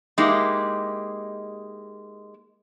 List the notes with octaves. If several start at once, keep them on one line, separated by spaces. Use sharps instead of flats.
G#3 A#3 D#4 E4 G4